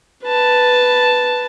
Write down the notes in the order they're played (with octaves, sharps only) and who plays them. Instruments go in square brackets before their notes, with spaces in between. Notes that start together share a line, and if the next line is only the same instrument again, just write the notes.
[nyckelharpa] B4 A5